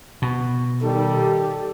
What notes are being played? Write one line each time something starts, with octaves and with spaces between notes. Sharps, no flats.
B2
D#3 G3 D#4 G4 A4